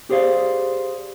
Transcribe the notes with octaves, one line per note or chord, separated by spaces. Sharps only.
G4 G#4 C5 D5 F5